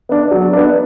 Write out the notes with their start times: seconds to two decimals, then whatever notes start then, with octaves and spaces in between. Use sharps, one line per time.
0.09 B3 D4
0.31 F#3
0.53 B3 D4